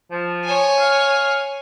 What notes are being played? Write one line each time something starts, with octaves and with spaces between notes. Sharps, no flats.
F3
C#5 G#5
F5